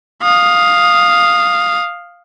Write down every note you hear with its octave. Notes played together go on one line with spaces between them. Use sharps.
F5 D#6